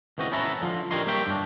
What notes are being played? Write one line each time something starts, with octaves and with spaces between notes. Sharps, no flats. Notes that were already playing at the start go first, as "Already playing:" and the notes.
C#2 E3 C4 F#4 D#5
B3 C#4 E4 A4 E5 A#5
D3 F3 D#4 F4
D4 G4 A#4 C#5 D#5 C6
G3 A#3 C#5 E5 G5
G2 D4